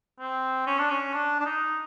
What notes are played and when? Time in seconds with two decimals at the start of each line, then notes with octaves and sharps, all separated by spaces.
0.20 C4
0.67 C#4
0.79 D4
0.90 C#4
1.13 D4
1.40 D4
1.45 D#4